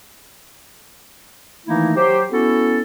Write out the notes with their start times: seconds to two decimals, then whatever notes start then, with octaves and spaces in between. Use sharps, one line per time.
1.67 D#3 E3 A3 A#3 D#4 E4
1.97 F#3 G4 C5
2.31 B3 C#4 E4 F#4 A4